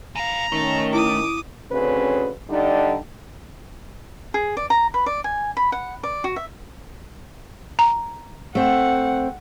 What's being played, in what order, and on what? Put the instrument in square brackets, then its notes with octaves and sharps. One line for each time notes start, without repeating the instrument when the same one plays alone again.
[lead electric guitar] E3 F5 [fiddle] A#5
[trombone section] D#3 C#4 [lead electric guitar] A3
[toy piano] E4 [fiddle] D6 D#6
[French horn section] D2 C#3 C4 C#4 B4
D3 G3 D4 D#4
[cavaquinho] G#4
D5
A#5
B4
D5
G#5
B5
F#5
D5
F#4
E5
[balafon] A#5
[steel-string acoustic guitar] A3 C4 [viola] F#5